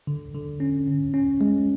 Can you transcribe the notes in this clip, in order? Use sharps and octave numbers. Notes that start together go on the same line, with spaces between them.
D3
D3
C#4
C#4
C#4
G#3